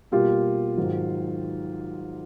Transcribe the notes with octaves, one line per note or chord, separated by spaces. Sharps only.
B2 G3 A#3 F4 G4
G#2 D#3 F#3